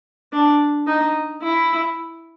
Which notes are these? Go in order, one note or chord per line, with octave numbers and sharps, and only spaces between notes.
D4
D#4
E4